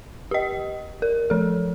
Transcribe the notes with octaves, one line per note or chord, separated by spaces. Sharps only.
G4 D#5
A#4
F3 A4